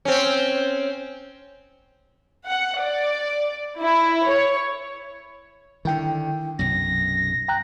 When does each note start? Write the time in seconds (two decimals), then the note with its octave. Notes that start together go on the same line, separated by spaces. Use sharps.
0.05 C4 C#4
2.47 F#5
2.81 D5
3.81 E4
4.27 C#5
5.85 D3 D#3 E4 G5
6.59 B1 F#2 C3 A#6
7.48 G5 A#5 F#6